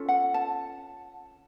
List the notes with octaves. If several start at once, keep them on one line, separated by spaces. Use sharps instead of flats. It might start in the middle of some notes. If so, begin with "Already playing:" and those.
Already playing: C#4 F4 A4
F#5
A5